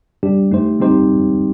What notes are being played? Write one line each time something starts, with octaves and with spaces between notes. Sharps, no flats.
G3 D4 G4
A3 D#4 G4 C5
G3 C4 D#4 G4 C5